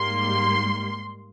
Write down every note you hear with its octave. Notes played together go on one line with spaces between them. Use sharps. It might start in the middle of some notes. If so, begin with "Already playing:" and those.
Already playing: G#2 G3 A#3 C6